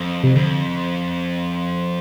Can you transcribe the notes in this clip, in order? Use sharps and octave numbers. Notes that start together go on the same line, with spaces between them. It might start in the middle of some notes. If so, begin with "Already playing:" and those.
Already playing: F2
C3
F2 D3